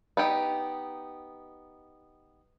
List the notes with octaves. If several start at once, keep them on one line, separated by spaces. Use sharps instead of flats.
B3 D#4 G4